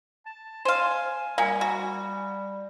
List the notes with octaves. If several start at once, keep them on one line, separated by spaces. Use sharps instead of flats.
A5
C5 F5 G#5
G3 A#3 F5 G#5
F#4